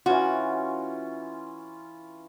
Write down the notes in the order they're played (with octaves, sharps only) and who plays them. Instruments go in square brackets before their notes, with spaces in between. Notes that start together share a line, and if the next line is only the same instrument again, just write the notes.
[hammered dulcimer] E3 C#4 F4 [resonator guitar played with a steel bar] F#4